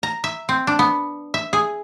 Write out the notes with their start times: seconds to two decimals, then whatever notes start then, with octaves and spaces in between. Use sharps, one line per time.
0.03 A#5
0.24 E5
0.49 C4
0.67 D4
0.79 B3
1.34 E5
1.53 G#4